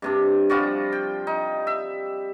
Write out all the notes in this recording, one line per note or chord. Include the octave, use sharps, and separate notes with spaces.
G2 C3 D4
F3 G3 F4 F#4
G5
D#4
E5